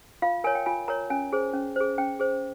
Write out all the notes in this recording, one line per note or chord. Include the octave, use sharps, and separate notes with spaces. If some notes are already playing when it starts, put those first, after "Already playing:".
F4 F5
A#4 C#5 G#5
G5
F4 G#5
A#4 C#5 A#5
C#4 G#5
G#4 C5
C#4
G#4 C5
C#4 G5
G#4 C5